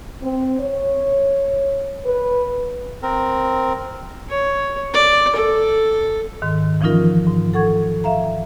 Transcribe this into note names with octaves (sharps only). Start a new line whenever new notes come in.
C4
C#5
B4
C4 A#4
C#5
D5
A4
G#2 D#3
E3 F3 C#4 D#4 F4 A#4
G#2
A4 F#5 C#6 G#6
E5 F5 A#5